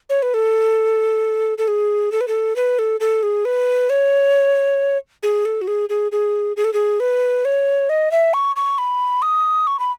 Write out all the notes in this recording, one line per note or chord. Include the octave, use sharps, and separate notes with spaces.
C#5
B4
A4
A4
G#4
A4
B4
A4
B4
A4
A4
G#4
B4
C#5
G#4
A4
F#4
G#4
G#4
G#4
G#4
A4
G#4
B4
C#5
D#5
E5
C#6
C#6
B5
D#6
C#6
B5